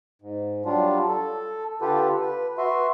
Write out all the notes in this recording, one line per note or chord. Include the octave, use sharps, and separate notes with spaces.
G#2
F#3 G3 D4 F4
A4
D3 F4 G4 A4 B4
B4
F#4 B4 E5 C6